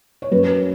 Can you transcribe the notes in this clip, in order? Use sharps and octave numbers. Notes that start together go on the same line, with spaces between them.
C#5
F#2 B4